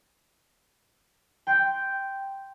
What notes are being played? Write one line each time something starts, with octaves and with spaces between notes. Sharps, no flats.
G5 C6 G6